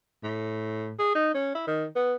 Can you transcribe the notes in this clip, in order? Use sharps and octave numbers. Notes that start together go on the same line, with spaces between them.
A2
G#4
D#4
C#4
E4
D#3
B3